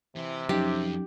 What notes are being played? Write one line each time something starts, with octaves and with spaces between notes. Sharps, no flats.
C3 E3
F2 F#3 C#4 D#4 G4